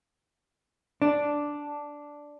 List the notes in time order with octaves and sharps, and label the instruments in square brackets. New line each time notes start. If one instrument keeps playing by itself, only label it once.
[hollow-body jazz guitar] D4